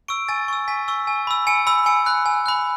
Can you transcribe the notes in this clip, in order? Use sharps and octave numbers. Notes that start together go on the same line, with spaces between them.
C#6 E6 D7
G#5 A6
C#6 E6
G#5 B6
C#6 E6
G#5
B5 E6
G#5 C#7
B5 E6
G#5 C#7
B5 F#6
G#5
B5 F#6